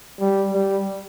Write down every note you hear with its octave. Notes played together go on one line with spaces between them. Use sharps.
G3
G3